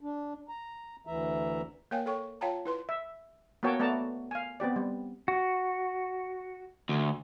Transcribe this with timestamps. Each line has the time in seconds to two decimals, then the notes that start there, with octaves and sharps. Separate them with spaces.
0.01 D4
0.49 A#5
1.07 D2 E3 E5 A#5
1.91 A#3 A#4 C#5 F5 G5 G#5
2.06 A4 C#5 G5 C#6
2.41 F4 C#5 F5 G5 A5 A#5
2.65 E4 B4 C6
2.89 E5
3.63 A#3 B3 F#4 C#5 G5 A5
3.80 A3 B3 D5 A5 A#5
4.31 F5 G#5
4.60 B3 C4 G4 D5
4.76 G3
5.28 F#4
6.89 D2